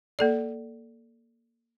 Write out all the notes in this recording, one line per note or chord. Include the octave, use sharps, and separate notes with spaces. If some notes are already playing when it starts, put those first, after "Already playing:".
A#3 A4 D5